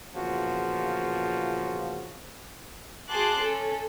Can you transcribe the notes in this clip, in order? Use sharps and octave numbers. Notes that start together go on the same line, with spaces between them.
E2 A#2 C#3 F3 F4 F#4
F#4 G#4 A5 C6 D6 F#6
C#4 A4